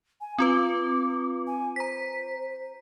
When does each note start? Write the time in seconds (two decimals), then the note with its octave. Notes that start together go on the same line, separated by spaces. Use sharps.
0.21 G#5
0.38 C4 F4 B4 D6
1.47 G#5
1.76 C5 A#5 B6